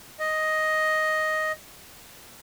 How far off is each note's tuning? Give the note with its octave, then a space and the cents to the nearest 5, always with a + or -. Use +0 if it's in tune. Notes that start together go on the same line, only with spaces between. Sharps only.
D#5 +5